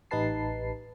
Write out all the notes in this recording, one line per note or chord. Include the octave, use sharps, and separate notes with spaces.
A1 D#4 G4 B4 A5 C7